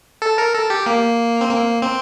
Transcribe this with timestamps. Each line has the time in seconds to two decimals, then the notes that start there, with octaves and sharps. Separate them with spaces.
0.22 A4
0.38 A#4
0.54 A4
0.70 G4
0.86 A#3
1.41 C4
1.50 A#3
1.82 C4